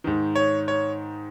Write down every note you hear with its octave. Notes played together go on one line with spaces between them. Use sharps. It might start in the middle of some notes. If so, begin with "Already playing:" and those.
G#2 D#3
C#5
C#5